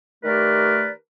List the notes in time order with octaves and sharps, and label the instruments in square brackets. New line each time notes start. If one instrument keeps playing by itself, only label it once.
[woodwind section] D#3 A3 G4 A#4 B4 D5